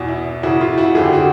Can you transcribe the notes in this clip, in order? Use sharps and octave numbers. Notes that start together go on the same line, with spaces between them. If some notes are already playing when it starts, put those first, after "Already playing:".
Already playing: E2 B2
E4
E2 C#3 E3 E4 F#4
F4
E4 F#4
F2 D3 F3 G#4
G4
F#4